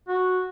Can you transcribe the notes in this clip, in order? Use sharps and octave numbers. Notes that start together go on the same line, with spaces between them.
F#4